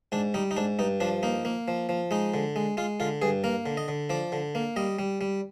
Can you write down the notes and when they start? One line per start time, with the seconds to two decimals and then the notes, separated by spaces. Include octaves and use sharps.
0.12 G#2 D4
0.34 G3 D#4
0.51 D#4
0.57 G#2 D4
0.79 G2 D#4
1.00 F3 D4
1.23 A#3 D#4
1.45 A#3
1.68 F3
1.89 F3
2.11 G#3 D#4
2.34 D3
2.56 G#3
2.77 G#3 F4
3.00 D3 F4
3.22 G2 G#4
3.44 A#3 A#4
3.66 D3
3.77 D#5
3.88 D3
4.10 F3 D5
4.32 D3
4.55 A#3
4.76 G3 D#5
4.99 G3
5.21 G3